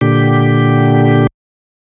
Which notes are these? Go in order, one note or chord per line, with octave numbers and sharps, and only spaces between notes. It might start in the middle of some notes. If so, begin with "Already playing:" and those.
A#2 D3 G4